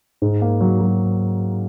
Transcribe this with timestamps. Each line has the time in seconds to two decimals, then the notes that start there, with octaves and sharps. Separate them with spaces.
0.22 G#2
0.42 A#3
0.61 F#3
0.81 F#3